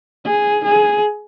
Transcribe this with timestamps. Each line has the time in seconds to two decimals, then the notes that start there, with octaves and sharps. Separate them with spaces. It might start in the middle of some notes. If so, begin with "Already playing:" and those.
0.25 G#4
0.65 G#4